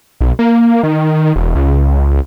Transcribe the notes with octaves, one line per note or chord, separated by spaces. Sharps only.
B1
A#3
D#3
E1
C#2